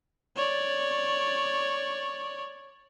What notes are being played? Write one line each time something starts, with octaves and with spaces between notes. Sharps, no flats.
C#5 D5